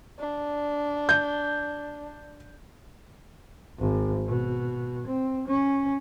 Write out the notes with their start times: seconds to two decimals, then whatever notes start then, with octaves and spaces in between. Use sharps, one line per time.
0.19 D4
1.09 G6
3.79 G#1
4.26 B2
5.07 C4
5.48 C#4